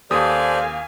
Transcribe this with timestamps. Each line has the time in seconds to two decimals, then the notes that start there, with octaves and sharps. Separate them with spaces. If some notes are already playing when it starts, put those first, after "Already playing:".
0.11 D#2 G4 A4 C5 D5 F5 G#5 D#6